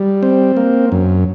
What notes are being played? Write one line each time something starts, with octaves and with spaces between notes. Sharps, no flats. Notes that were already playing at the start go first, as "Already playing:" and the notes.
Already playing: G3
C4
A#3
F#2